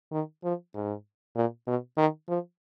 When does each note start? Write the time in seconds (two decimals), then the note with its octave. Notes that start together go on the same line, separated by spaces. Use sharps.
0.12 D#3
0.44 F3
0.74 G#2
1.36 A#2
1.67 B2
1.97 D#3
2.29 F3